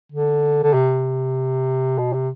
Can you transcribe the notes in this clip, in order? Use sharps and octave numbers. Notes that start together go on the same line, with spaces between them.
D3
D3
C3
B2
C3